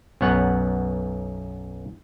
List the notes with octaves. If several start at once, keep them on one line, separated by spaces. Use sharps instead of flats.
B1 F#2 B3 C#5 F#5